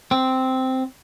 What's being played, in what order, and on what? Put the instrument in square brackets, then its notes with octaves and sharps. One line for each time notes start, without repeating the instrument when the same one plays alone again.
[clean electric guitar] C4